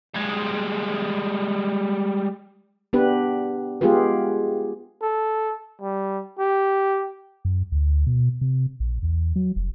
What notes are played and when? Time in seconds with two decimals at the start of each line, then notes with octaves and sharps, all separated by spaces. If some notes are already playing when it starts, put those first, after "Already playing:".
0.14 G3 G#3
2.93 B3 D4 G4 B4
3.81 G#3 B3 F4 G4 G#4 B4
5.02 A4
5.81 G3
6.38 G4
7.45 F#2
7.72 D2
8.07 B2
8.41 C3
8.80 A#1
9.02 E2
9.36 F#3
9.56 F1